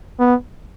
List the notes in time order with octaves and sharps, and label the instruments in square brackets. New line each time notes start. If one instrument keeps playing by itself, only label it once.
[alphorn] B3